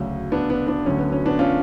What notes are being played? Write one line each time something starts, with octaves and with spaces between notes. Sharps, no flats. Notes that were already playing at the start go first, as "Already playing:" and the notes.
Already playing: D2 C#3 F#3 C#4
B3 D4
B3 D4
B3 D4
D2 D3 F#3 C#4
B3
C#4
B3 D4
C#4 F4